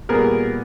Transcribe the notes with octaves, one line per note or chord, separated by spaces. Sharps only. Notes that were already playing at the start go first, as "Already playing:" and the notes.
A#2 G3 B3 G#4 A#4